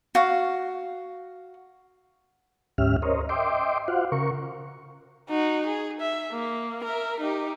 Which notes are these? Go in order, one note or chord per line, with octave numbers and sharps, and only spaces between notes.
F#4 F5
D2 G#2 C#4 G4 E5 F6
A#4 C5 C#5 D#5
D#5 E5 G5 C6 D6
F4 F#4 C5 F5 F#5
C#3 A#4 C#6
D#4 F#4
G#4
E5
A#3
A#4 E5
D#4 G4